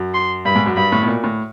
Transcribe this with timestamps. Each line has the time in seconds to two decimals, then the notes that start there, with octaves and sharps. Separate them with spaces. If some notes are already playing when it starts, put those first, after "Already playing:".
Already playing: F#2
0.14 C6
0.45 G2 B5
0.56 G#2
0.66 F#2
0.76 G2 B5
0.92 A2
1.02 B2
1.07 A#2
1.24 A2